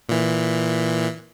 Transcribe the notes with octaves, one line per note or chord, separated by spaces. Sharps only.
A#2 E3